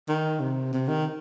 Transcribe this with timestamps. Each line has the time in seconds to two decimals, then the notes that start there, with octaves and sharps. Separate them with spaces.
0.08 D#3
0.40 C3
0.73 C3
0.88 D#3